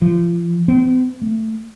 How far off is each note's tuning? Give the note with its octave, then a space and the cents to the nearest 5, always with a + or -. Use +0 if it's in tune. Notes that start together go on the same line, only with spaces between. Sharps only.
F3 -35
C4 -45
A3 +10